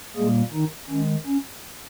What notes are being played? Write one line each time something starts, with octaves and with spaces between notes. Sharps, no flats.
A#2 G3 G#3 A#3 G#4
D#3 D#4
D#3 G#3 C#4
C#4